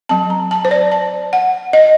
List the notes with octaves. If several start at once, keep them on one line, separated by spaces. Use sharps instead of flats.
F#3 C4 A5
A#5
A5
C5
D5
A5
F#5
D#5